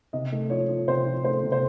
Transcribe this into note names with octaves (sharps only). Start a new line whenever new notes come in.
C3 D#5
A3
F3 C#5
F3
C3 C5
F3
A3 C5
C3
C5